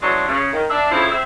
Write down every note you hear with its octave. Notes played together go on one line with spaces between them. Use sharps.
E3 F#3 G#3 A3 C#4 D4
C#3
D#3
D4 E5
F2 C#3 F3 E4
C4 E5